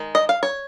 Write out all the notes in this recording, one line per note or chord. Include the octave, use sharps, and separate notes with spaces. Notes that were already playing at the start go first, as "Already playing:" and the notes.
Already playing: D#3 G#3
D#5
F5
C#5